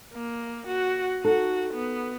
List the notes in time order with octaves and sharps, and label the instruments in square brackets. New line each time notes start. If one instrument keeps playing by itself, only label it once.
[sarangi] A#3
F#4
[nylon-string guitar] D#4 A4 [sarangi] F#4
[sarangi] B3